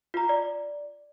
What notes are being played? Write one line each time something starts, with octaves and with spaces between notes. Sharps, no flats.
F4 A#5
D5